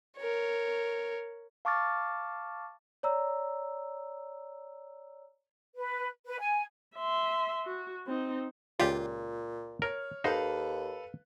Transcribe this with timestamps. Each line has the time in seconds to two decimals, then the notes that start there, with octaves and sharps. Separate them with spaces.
0.18 A#4 C#5
1.65 F5 A5 C#6 D6 F6 A6
3.03 C#5 D5 A#5 E6
5.76 B4
6.26 B4
6.39 G#5
6.96 E5 C6
7.65 F#4
8.07 C4 D#4
8.80 C#2 A#2 F4 G4 D5
9.82 A#4 C#5 F6
10.24 D#2 D#4 A4 B4 C5 F5